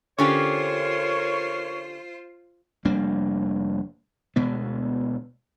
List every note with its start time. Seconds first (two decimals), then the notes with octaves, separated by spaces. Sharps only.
0.19 D3 C#4 F4 G4 A#4 C5 C#5 C#6
2.85 F1 G3 A#3 D4
4.36 D2 B2 G#3 B3